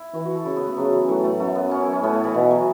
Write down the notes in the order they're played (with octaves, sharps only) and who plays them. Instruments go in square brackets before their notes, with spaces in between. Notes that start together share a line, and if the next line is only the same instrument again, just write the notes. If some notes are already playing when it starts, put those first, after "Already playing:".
Already playing: [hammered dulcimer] E4
[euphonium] E3 [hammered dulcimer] F#4
[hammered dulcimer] F#4
A4
[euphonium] C#3 [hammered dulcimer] E4
[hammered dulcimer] B3
A3
[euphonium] C#3 [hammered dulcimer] F#3
[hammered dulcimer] E3
[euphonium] A2 [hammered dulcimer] F#3
[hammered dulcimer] A3
[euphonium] F#2 [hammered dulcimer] A3
[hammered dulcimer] B3
C#4
E4
C#4
[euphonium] A2 [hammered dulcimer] B3
[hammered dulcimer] A3
E3
[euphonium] B2 [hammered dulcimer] E3
[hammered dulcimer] F#3